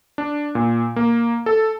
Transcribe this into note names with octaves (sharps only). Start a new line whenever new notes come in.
D4
A#2
A#3
A4